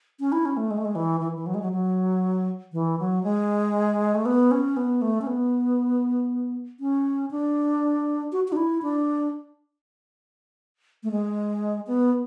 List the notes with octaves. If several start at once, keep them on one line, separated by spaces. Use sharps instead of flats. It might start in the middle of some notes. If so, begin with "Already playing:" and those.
C#4
E4
C#4
A3
G#3
A3
G#3
E3
E3
E3
F#3
G#3
F#3
F#3
E3
F#3
G#3
A3
B3
C#4
B3
A3
C#4
B3
C#4
D4
F#4
F#4
D4
E4
D4
A3
G#3
B3